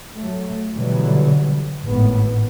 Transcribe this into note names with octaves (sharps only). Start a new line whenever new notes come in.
F#3 A3
B2 D3 E3 F#3 G3
G#1 A2 B3